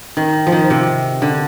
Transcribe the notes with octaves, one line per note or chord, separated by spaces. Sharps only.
D#3
F3
D#3
C3
D3